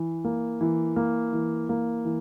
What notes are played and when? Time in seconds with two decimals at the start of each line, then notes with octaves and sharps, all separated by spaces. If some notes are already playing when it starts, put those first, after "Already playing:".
Already playing: E3
0.24 A#3
0.61 E3
0.96 A#3
1.33 E3
1.69 A#3
2.05 E3